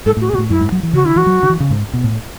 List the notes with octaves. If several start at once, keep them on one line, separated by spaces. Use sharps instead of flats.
G#2 A4
A2 F#4
G#4
B2 F#4
A2
F#2 E4
G#2
F#3
E3
C#3 F#4
D3 E4
E3 F#4
F#3
D3
E3
C#3
G#2
B2
A2